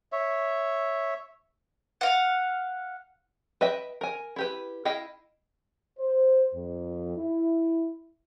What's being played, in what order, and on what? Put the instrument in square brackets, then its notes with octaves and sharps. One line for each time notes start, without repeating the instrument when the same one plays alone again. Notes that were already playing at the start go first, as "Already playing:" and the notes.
[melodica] C#5 E5
[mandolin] F5 F#5
[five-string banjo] B4 D#5 E5 G5
A#4 G#5
E4 G4 B4
E4 D#5 F5 G5
[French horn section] C5
F2
E4